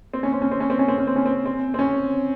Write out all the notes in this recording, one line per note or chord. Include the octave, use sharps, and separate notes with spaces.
C4
C#4
C4
C#4
C4
C#4
C4
C#4
C4
C#4
C4
C#4
C4
C4
C4
C#4